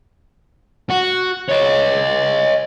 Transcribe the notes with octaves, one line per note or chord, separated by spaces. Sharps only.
F#4
C#5 D#5